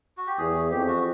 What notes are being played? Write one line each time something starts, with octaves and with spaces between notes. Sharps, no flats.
F#4
G4
E2 G#4
F2 G4
F#4